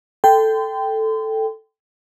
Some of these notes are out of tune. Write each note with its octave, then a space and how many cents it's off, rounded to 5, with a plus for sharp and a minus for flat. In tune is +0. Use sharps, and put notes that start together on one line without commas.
A4 +0 G5 +0 C6 -35